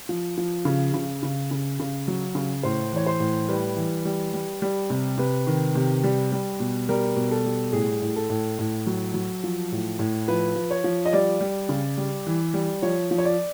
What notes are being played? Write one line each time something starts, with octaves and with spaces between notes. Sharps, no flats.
F3
F3
C#3
C#3
C#3
C#3
C#3
F#3
C#3
A2 C5
E3 C#5
C5
A2
G3 B4
E3
G3
G3
G3
C3
C3 B4
D#3
C3
G3
G3
B2
G3 A#4
B2
A4
G3
A2 G#4
A2
A4
A2
A2
F#3
F#3
F3
A2
A2
F3 B4
F3
C#5
F3
D#5
G3 D5
G3
C#3
G3
E3
G3
F3 C#5
F3
C#5
D5